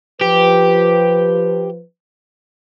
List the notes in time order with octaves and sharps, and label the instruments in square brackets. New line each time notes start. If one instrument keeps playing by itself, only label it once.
[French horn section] F3 B4 [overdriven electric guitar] G4